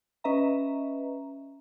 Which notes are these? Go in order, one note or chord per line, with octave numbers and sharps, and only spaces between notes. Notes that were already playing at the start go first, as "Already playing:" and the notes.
C#4 B4 D#5 E5 A#5